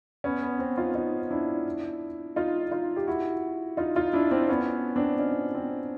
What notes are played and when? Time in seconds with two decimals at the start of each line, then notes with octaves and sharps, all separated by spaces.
0.24 B3 C#4
0.42 B3
0.59 C4
0.77 D#4 F4
0.95 D#4 F4
1.31 D4 E4
2.36 D#4 F4
2.71 D#4 F4
2.96 G4
3.07 E4 F#4
3.77 D#4 F4
3.96 D#4 F4
4.13 D4 E4
4.31 C4 D4
4.49 B3 C#4
4.96 C4 D4
5.19 C#4 D#4
5.55 C4